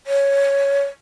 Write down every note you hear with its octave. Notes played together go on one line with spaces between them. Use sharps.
C#5